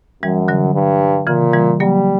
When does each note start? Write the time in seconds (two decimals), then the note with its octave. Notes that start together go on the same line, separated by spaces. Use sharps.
0.22 F#2 E3 G3
0.48 D3 F#3
0.74 G2
1.27 A#2 C#3 E3
1.53 E3 G3
1.80 F#3 G3 A#3